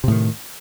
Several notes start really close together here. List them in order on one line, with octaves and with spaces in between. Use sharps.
C3 A2 D#3